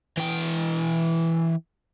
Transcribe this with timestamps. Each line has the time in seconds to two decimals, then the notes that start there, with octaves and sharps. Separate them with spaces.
0.17 E3 G5